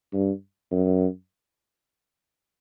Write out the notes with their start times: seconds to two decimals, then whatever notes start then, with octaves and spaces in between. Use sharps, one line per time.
0.13 G2
0.71 F#2